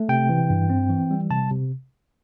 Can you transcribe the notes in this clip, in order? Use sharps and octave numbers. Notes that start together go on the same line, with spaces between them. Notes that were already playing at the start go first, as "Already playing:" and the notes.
Already playing: A3
C3 G5
E3
G2
C4
E3
G3
C3 A5
C3